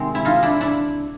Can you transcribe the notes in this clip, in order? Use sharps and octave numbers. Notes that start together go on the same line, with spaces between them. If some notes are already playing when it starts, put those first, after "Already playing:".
Already playing: C3 D#3 G#3 C4
E4
D#4 F4
D4 E4
D4 E4